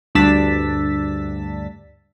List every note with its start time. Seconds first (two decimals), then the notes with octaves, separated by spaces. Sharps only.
0.15 D2 G2 D4 E6 A6 B6